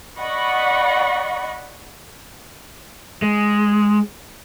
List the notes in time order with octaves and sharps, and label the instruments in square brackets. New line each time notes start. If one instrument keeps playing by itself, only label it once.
[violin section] D5 D#5 F#5 B5 C#6
[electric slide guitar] G#3